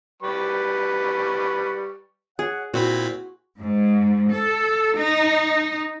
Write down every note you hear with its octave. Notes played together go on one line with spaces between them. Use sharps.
G3 B4 C#6
G#4 C#5 F#5
A#2 C4 E4 F#4 B5
G#2
A4
D#4